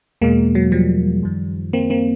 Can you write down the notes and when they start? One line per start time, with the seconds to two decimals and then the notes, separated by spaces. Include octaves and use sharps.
0.21 E2 B2 G#3 A#3
0.55 F#3
0.72 F3 G3
1.23 F#2 D#3
1.73 A#3 C4
1.90 A#3 C4